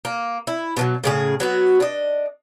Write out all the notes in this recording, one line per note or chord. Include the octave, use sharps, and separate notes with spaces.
A#3
E4
B2 F3 F#3
A2 C#3 G#4
F#3 B3 F#4
D4 D#5